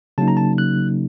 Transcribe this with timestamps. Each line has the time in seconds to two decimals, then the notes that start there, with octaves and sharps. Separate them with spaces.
0.18 C#3 F#3 A#3 D#4 A5
0.28 A#5
0.37 A5
0.58 F#6